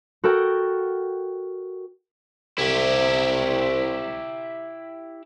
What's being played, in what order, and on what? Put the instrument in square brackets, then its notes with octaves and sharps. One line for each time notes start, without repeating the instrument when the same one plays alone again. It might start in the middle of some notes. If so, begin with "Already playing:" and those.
[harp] F#4 A4 A#4 G5
[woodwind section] C2 C3 [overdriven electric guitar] E4 G4